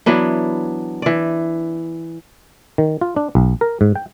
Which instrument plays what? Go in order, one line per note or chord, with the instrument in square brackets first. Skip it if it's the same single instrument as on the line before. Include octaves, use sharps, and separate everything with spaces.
[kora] E3 F#3 B3 D4
E3 D5
[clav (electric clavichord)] D#3
F4
D4
B1
A#4
G#2
G5